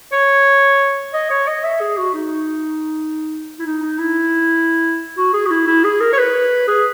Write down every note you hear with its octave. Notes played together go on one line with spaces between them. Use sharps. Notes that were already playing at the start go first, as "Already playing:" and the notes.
C#5
D#5
C#5
D#5
E5
G#4
F#4
D#4
E4
D#4
D#4
E4
F#4
G#4
F#4
E4
E4
G#4
A#4
C#5
B4
G#4